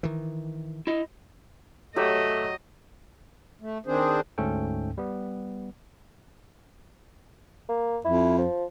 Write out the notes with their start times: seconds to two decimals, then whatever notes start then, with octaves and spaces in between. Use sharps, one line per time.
0.03 D#3 E3
0.87 E4 D#5
1.96 F#3 A3 G4 D#5
3.61 A3
3.86 D#3 C4 D4 G#4 C5
4.38 D2 G#2 A3 C#4 A4 G5
4.98 G3 B3
7.69 A#3
8.05 F2 E4
8.38 F3